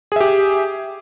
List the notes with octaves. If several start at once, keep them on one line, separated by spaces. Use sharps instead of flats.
G4 G#4 E5